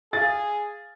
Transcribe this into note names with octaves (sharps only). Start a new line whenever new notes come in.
G#4 F5 A6